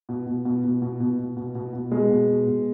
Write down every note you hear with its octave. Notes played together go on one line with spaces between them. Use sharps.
B2
B2
B2
B2
B2
B2
B2
B2
B2
B2
B2 G#3
B2
B2
B2